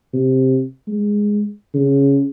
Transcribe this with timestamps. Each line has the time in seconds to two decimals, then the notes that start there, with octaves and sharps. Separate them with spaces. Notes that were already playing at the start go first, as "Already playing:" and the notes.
0.13 C3
0.88 G#3
1.74 C#3